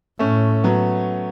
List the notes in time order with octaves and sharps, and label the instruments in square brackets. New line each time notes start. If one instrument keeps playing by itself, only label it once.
[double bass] A2 [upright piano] A3 C#4
[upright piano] F#3 B3